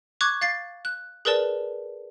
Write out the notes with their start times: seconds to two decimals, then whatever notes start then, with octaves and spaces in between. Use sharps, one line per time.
0.21 C#6 D6 F#6 G#6
0.41 F5 A6 C7
0.85 F#6
1.25 G#4 A#4 B4 D5 A5